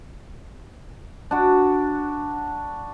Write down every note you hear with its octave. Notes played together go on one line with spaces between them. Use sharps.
D4 F#4